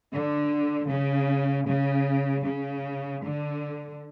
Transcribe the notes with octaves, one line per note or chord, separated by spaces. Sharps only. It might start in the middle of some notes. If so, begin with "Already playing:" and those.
D3
C#3
C#3
C#3
D3